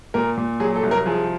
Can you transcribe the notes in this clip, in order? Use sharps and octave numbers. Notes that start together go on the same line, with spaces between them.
A#2 A#4
A#2
F#3 G#4
A4
C2
A#4
F3 G#4